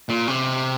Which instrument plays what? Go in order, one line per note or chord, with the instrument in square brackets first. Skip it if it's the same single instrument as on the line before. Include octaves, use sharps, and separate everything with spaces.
[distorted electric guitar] A#2
C3